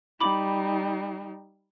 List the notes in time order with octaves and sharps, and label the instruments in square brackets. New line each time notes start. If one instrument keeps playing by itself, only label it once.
[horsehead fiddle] G3 D#4 [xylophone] B5 D6 F#7